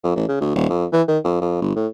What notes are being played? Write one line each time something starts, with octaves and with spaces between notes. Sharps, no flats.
F2
A1
C#3
D2
D#1
F2
E3
D#3
F2
F2
G1
A2